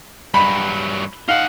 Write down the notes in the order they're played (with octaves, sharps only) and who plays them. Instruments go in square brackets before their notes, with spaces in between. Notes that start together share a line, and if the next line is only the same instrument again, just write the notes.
[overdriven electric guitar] G2 F#3 [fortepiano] B5
[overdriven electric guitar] D#4 F#5 [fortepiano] F5